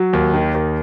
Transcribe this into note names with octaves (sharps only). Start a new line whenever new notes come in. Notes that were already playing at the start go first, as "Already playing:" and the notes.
Already playing: F#3
D#2
D#3
D#2